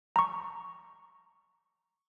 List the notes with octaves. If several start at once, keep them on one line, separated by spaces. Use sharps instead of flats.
A#5 C#6